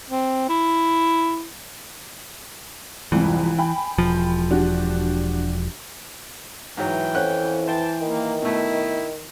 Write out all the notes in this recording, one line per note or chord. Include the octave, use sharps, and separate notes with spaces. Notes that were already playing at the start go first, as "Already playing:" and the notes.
C4
E4
C2 F2 G#2 E3
G5 G#5 B5
E1 F3
D4 F#4 G4
G#2 E3 F#3 G5
F2 C#4 F#5 F#6
C5 G5 A5
D#3 A#3
B2 A3 E4